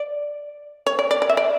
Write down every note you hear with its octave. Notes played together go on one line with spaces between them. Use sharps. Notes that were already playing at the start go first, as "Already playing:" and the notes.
Already playing: D5
C#5
D5
D5
D5
E5
D5